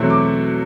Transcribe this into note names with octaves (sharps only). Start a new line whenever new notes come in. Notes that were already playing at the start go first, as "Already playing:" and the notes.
Already playing: E2 B2 F#3 A3 C4
D6